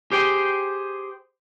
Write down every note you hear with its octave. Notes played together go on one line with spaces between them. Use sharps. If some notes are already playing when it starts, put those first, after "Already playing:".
G4 G#4 C5 G5